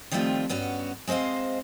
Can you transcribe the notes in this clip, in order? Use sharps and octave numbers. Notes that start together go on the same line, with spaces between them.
D#3 F3 G3 A3 C4 F4
G2 B3 C#4 F#4
G#3 C4 C5 D#5 F5